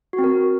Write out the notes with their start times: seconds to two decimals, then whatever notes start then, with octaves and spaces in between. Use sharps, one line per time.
0.13 F#4
0.19 C4
0.24 A#4